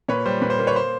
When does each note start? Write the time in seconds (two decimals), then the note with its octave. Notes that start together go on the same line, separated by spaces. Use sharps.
0.08 A#2 B4 C#5
0.26 G3 C5
0.42 A#2 B4
0.50 C5
0.58 A#3
0.67 B4 C#5
0.76 C5